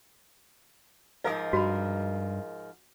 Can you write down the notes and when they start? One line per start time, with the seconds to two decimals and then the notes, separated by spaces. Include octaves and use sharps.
1.24 G#2 F3 A#4 D#5 F5 D#6
1.53 G2 F#4 B5